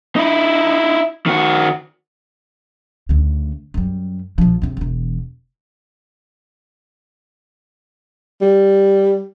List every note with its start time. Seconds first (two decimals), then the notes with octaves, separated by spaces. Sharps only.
0.16 D#4 E4
1.26 D#3 F#4
3.09 D2 C#3
3.74 F#2 G3
4.38 A#1 F3
4.62 E2 C3
4.77 E1 E2
8.42 G3